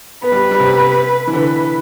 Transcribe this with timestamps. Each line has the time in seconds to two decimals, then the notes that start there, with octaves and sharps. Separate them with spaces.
0.22 B3 B4
0.32 G3
0.51 G3
0.60 C3
1.27 E3
1.33 D3 B4